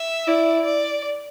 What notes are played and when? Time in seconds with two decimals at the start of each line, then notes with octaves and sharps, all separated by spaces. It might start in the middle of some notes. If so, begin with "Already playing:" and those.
Already playing: E5
0.27 E4 D5
0.65 D5